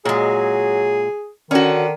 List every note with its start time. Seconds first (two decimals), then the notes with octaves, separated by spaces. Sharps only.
0.05 A#2 F#3 G#3 G#4
1.51 D3 D#3 C#4 F#4